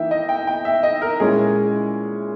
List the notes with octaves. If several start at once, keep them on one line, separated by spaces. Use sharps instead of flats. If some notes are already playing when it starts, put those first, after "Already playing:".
Already playing: E3 A#3 D#4 E5 G5
D#5
G5
G5
E5
D#5
A#4
A#2 G#3 C#4 E4 G#4